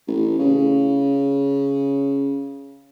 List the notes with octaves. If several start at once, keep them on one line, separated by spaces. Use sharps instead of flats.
A1
C#3